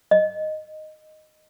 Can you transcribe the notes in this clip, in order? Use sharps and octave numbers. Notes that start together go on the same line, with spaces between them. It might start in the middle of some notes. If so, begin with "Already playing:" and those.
D#5